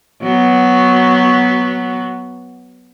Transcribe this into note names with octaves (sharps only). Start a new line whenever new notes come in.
F#3 B3 F#4